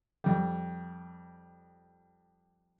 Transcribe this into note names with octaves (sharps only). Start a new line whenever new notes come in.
F2 G3